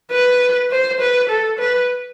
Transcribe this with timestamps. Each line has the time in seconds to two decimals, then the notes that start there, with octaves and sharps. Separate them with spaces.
0.12 B4
0.71 C5
1.01 B4
1.30 A4
1.59 B4